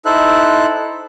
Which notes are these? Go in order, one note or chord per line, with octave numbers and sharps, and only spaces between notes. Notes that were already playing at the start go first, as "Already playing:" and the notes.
D#4 E4 A4 C5 E5 F#6